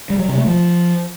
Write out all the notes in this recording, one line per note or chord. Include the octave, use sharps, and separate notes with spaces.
G3
F#3
C3
A3
F3